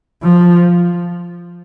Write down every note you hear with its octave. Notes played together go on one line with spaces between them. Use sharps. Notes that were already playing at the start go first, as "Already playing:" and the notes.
F3